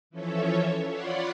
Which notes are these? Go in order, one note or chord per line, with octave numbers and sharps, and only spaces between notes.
E3 F3 C#4 A4 C#5 E5
F4 C#5 D5 F#5 B5 C6